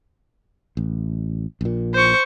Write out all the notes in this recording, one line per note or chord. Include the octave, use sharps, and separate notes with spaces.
A1
A#1 A#2
C5 C#6